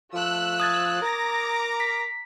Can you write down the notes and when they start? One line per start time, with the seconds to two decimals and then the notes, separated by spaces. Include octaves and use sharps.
0.14 F3 A3 E6 F#6
0.60 D#6 G#6 A6
1.02 A#4 A#5 D6 A#6
1.80 B6